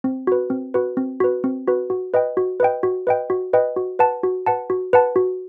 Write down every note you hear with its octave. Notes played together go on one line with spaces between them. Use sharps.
C4
F#4 B4
C4
F#4 B4
C4
F#4 B4
C4
F#4 B4
F#4
B4 D#5 G5
F#4
B4 D#5 G5
F#4
B4 D#5 G5
F#4
B4 D#5 G5
F#4
B4 F#5 A5
F#4
B4 F#5 A5
F#4
B4 F#5 A5
F#4